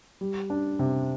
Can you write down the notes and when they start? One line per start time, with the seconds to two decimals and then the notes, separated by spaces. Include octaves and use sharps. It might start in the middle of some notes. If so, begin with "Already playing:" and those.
0.21 G3
0.50 D4
0.79 C3